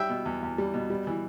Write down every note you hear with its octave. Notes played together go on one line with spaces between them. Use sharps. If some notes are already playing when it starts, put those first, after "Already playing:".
Already playing: G3 E5 G5
B2
E2
E2
G3
B2
G3
E3